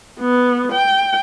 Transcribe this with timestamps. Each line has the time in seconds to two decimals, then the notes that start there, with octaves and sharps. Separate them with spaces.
0.20 B3
0.73 G5